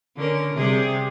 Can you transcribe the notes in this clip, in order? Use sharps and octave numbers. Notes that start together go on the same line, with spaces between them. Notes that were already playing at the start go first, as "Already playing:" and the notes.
D3 C#4 A#4
C3 G3 G#4